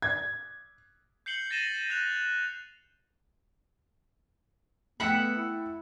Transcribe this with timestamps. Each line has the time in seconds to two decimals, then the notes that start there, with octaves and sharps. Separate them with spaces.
0.02 G#6
1.26 G6 C7 C#7 F#7 G7
1.50 A6 A#6 C7 D#7 E7 G7
1.90 F#6 A#6 D#7 F7
5.00 A3 B3 E5 F#5 G5 B5 C#7
5.37 E4